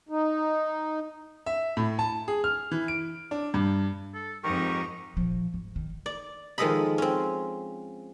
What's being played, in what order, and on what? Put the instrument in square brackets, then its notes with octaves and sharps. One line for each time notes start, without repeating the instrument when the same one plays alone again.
[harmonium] D#4
[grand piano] E5
A2
A5
G#4
F6
E3
D7
D4
G2
[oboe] A4
[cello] F2 D#4 [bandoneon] G#2 G4 A#4 [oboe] C#6
[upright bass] A#2 F3
G#2
D#3
[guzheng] D5
D#3 F3 G#3 A4 D#5 B5
C4 C#4